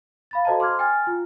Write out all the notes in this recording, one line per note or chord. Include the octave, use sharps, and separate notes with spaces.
F5 B5 A6
F#4 A4 C5 D#5 A5 A#5
C6 D6 F6 G#6
G5 G#5 F6 A6
F4